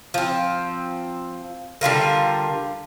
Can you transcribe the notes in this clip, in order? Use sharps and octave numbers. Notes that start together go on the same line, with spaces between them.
F3 C4
D3 G3 F4 A#4